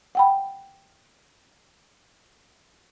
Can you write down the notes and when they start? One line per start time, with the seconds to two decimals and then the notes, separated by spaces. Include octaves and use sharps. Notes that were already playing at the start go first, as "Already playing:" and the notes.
0.15 F#5 G5 B5